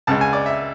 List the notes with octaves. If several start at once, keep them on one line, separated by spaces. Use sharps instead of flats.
C#2 C#3 G#3 A5
G#5
D5
E5